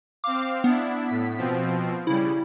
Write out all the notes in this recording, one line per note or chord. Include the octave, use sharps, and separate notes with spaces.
C4 F5 D6
B3 D4 E4
A2 B6
B2 F3 C4
C#3 G3 E4